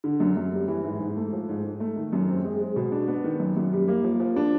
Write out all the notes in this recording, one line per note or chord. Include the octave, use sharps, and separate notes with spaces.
D3
F#2
F#2
G3
E3
G#2
G#2
A3
F3
G#2
G#2
A3
D#3
F#2
C4
G#3
G#3
B2
D4
B3
D#3
F#2
F#2
G3
A#3
F3
F3
D4